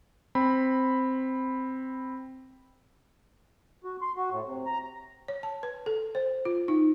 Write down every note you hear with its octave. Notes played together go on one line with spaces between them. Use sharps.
C4 B5
F#4
C6
F#4
A2
C3
A#5
C#5
A5
B4
A4
C5
F4
D#4